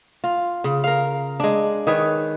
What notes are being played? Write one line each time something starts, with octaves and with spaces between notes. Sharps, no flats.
F4
C#3
A#4 F5
G#3 D4
D#3 G#4 B4 C#5